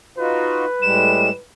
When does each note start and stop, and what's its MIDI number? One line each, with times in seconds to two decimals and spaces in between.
0.18 0.65 63
0.18 0.65 65
0.18 0.65 66
0.18 1.43 71
0.82 1.29 45
0.82 1.29 55
0.82 1.29 56
0.82 1.30 100